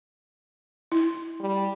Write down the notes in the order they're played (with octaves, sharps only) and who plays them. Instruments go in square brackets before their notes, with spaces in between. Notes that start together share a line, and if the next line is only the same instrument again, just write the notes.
[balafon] E4
[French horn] G3